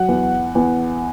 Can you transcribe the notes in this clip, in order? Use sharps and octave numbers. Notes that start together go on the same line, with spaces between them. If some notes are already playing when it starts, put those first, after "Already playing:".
Already playing: F#3 F#5
E2
E2